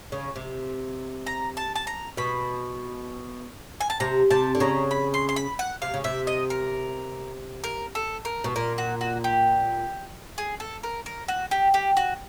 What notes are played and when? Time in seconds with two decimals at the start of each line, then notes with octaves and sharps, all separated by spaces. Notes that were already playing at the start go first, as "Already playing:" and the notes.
0.12 C#3
0.36 C3
1.26 A#5
1.57 A5
1.76 A5
1.87 A#5
2.17 B2 B5
3.81 G#5
3.90 A5
4.00 C3 A#5
4.30 C3 A5
4.55 D3
4.60 C#3 A#5
4.91 B5
5.14 C6
5.29 C6
5.36 B5
5.59 F#5
5.82 C3 F5
5.94 C#3
6.04 C3 E5
6.27 D#5
6.50 A#4
7.64 A#4
7.95 A4
8.25 A#4
8.44 B2
8.56 A#2 A#4
8.78 F#4
9.01 F#4
9.24 G4
10.38 G#4
10.60 A4
10.83 A#4
11.06 A#4
11.28 F#4
11.51 G4
11.74 G4
11.97 F#4